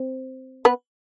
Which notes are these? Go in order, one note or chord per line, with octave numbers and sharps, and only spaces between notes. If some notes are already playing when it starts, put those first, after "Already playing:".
Already playing: C4
B3 B4